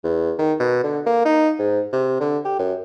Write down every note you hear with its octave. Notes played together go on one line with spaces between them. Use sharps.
E2
D#3
B2
D3
A#3
D#4
G#2
C3
D3
G4
F#2